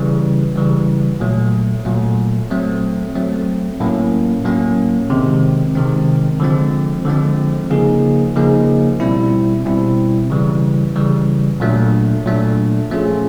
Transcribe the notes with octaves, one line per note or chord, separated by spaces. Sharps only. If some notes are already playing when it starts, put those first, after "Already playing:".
Already playing: C#3 E3 G3
C#3 E3 G3
A#2 F#3 A3
A#2 F#3 A3
F#3 A3 C4
F#3 A3 C4
A2 F#3 A#3 C#4
A2 F#3 A#3 C#4
C3 D#3 G#3 C4
C3 D#3 G#3 C4
D3 F3 G#3 C4
D3 F3 G#3 C4
C#3 F3 A#3 D#4 G#4
C#3 F3 A#3 D#4 G#4
B2 G3 C4 E4
B2 G3 C4 E4
C#3 E3 G3
C#3 E3 G3
A#2 F#3 A3 D4
A#2 F#3 A3 D4
F3 A3 C#4 F4 G#4